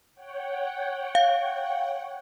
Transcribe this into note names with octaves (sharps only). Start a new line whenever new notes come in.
C#5 F#5 G5
F5